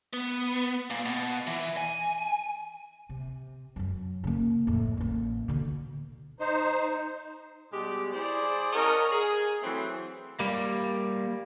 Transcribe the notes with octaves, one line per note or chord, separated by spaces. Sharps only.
B3
A#2
B2
E3
G#5
C3
F#2 F#3
C#3 A#3
F2 A2
A1 A#3
B2 D3
D#4 C5
B2 G3 G#3 G4
E4 G#4 C5 D5
C#4 A#4 C#5 D#5 F#5 A5
G#4
E3 F#3 A3 C4
G3 A#3